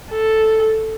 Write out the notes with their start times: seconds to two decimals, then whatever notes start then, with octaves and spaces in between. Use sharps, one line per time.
0.11 A4